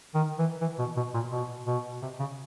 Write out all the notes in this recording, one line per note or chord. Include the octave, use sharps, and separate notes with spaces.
D#3
E3
E3
B2
B2
A#2
B2
B2
C3
C#3